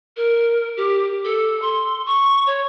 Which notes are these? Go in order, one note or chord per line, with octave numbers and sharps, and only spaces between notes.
A#4
G4
A4
C6
C#6
C#5